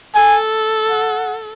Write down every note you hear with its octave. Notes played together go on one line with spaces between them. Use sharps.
A4 G#5
F#5